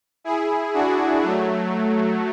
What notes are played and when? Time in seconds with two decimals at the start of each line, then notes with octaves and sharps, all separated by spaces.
0.24 E4 G#4
0.74 D4 F#4
1.23 F#3 A3